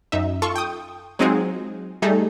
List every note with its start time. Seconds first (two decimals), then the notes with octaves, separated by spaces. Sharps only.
0.12 F#2 D#4 E5
0.42 F4 A4 C#6
0.56 G5 D#6
1.19 F#3 G#3 C4 D#4 F4 G#4
2.02 G3 A3 D#4 G#4 A4